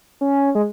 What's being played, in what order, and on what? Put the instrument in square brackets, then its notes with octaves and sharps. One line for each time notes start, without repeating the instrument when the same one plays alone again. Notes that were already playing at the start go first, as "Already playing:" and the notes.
[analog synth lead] C#4
G#3